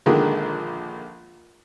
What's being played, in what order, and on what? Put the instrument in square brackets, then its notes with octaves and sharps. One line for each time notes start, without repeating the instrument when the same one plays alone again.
[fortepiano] A#1 D3 D#3 G#3